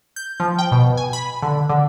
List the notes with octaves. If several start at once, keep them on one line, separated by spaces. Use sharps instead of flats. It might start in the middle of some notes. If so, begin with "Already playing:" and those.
G6
F3
G5
B2
G#5
B5
D3
D3